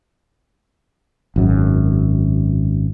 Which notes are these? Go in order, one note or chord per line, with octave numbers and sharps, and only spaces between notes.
G#1 F#2